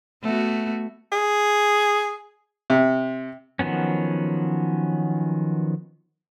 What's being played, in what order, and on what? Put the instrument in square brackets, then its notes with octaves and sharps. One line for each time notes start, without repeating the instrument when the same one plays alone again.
[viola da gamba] A3 B3 F#4
[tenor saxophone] G#4
[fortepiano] C3
[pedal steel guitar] D#3 F3 F#3 B3 C#4